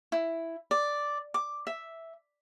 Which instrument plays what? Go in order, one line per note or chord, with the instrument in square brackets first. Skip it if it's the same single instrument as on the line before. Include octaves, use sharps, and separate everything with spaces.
[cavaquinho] E4
D5
D6
E5